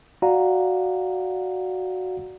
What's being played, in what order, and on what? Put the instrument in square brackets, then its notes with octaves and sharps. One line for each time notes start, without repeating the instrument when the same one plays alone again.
[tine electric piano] F#4 D5 F5 F#5 A#5